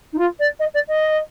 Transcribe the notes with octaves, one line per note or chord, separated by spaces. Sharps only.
D#4
F4
D5
D#5
D5
D#5